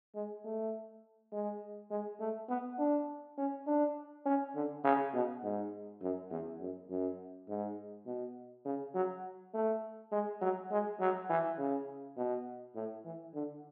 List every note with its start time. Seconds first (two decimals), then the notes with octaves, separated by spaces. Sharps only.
0.15 G#3
0.44 A3
1.32 G#3
1.91 G#3
2.20 A3
2.49 B3
2.79 D4
3.38 C#4
3.67 D4
4.25 C#4
4.55 D3
4.84 C#3
5.14 B2
5.43 G#2
6.02 F#2
6.30 E2
6.61 F#2
6.90 F#2
7.48 G#2
8.06 B2
8.65 C#3
8.95 F#3
9.54 A3
10.12 G#3
10.41 F#3
10.71 G#3
11.00 F#3
11.30 E3
11.58 C#3
12.17 B2
12.75 A2
13.05 E3
13.34 D3